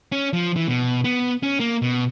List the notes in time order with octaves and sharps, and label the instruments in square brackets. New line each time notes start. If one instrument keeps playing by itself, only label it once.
[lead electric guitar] C#4
F3
E3
B2
B3
C#4
A#3
B2